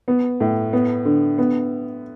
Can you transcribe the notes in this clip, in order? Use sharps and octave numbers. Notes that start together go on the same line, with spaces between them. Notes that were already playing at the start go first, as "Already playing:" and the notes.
B3
A2
B3
D3
B3